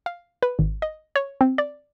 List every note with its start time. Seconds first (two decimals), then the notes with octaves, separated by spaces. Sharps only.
0.06 F5
0.42 B4
0.59 G#1
0.82 D#5
1.16 C#5
1.41 C4
1.58 D5